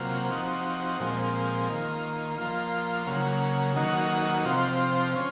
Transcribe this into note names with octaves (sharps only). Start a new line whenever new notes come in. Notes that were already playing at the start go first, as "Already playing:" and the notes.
Already playing: C3 F#3 A#3 F4
F3 C4 D#4 F#4
A#2 F3 G#3 C4
D#3 A#3 F4
F3 A#3 F4
C#3 F#3 A#3
D#3 F#3 A#3 D#4 F#4
C3 F3 C4 F4
C#4 F4